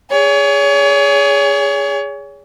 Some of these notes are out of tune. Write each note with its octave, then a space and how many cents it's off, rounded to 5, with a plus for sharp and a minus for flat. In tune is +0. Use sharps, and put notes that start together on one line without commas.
G#4 -10 C#5 +35